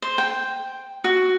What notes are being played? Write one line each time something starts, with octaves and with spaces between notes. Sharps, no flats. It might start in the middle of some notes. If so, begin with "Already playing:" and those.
C5
G5
F#4